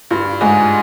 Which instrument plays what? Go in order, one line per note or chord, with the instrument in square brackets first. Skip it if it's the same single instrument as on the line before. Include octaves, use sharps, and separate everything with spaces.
[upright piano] G2 [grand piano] F4
[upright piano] G#2 [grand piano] G#3